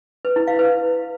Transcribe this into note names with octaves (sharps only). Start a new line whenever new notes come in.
B4
E4
F5
B4